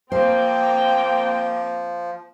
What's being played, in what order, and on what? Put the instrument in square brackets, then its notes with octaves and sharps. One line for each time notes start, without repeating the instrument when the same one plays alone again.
[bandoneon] F3 [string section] A#3 C4 [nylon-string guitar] C5 [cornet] G5